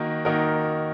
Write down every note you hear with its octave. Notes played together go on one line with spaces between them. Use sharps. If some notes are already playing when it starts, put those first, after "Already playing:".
Already playing: D#3 A#3 D#4 F#4 A#4
D#3 A#3 D#4 F#4 A#4